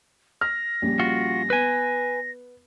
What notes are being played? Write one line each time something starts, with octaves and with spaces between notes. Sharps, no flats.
F6 A#6
A#1 G3 C#4
F4 F#4
B3 B4 G#5